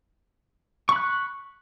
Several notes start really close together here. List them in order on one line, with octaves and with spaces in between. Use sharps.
C#6 B5 F#6